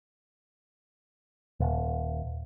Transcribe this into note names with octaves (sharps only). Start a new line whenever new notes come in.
D#1